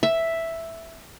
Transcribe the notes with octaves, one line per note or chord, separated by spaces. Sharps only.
E5